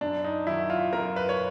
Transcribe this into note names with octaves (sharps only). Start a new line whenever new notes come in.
F#2 D4
D#4
D#3 F#3 E4
F4
F#2 A#4
B4
C#5